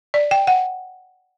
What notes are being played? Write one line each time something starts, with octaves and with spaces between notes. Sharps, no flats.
D5
G5
F#5